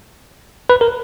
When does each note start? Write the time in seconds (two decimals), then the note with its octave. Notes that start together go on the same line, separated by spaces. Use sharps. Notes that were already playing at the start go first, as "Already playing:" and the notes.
0.70 B4
0.81 A#4